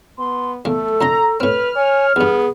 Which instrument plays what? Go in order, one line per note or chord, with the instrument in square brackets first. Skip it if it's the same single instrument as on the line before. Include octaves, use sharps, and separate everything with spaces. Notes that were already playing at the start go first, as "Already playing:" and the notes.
[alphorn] B3 [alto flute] C6
[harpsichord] E2 A#3 [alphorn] A3 [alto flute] A4
[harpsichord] F2 D3 C6 [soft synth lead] A#5
[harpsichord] A2 C4 [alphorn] B4 [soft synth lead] F6
[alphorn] C#5 [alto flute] G#5
[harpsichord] E2 G2 [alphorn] B3 [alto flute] G#4